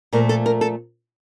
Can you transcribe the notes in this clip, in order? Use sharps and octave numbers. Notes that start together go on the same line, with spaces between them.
A#2 F3 A3 A#4
A4
A#4
A4